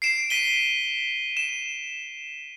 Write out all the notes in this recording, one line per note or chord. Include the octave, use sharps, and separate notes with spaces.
C7 D7 E7
B6 D#7 G7
E7